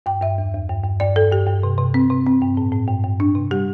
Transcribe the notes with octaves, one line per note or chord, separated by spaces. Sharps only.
G2 G5
G2 E5
E2
E2
G2
G2
G2 D5
G2 A4
G2 G4
G2
C3
C3
C4
C3
C4
G2
A2
A2
G2
G2
D4
C3
G3 G4